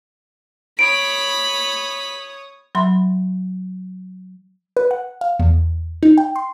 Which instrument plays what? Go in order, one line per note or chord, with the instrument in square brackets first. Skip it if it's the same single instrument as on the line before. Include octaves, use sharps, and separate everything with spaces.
[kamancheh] C#5 D#6 [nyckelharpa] B5 [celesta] D7
[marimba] F#3 E5 B5 C6
[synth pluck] B4
F#5
F5
E2
D#4
G5
C6